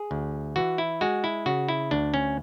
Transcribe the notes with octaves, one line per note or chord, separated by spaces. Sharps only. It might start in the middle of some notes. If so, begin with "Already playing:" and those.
Already playing: G#4
D2
E3 F#4
E4
G#3 F#4
E4
C#3 F#4
E4
D2 D4
C#4